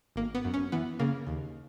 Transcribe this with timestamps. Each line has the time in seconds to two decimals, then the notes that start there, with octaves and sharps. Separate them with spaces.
0.16 G#1 A#3
0.35 B3
0.45 F#2
0.54 C#4
0.72 E3 B3
0.99 C#3 A#3
1.27 D#2